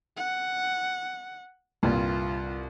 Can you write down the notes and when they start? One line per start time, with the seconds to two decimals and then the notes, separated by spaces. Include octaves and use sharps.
0.17 F#5
1.83 C2 G2 A#2 F4